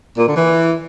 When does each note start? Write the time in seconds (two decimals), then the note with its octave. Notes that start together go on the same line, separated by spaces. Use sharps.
0.17 A#2
0.27 D3
0.36 E3